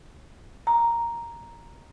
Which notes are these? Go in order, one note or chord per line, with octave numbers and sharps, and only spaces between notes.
A#5